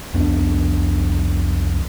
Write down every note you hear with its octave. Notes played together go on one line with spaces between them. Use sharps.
C2 F2 B3 D4